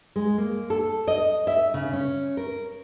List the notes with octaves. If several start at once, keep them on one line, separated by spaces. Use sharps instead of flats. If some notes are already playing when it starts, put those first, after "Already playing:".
G#3
A#3
A4
D#5
E5
C#3
C#4
A#4